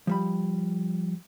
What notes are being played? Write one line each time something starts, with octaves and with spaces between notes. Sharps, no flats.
F3 G3 B5